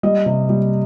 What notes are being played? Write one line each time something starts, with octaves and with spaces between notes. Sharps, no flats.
G3 D#5
C3
G3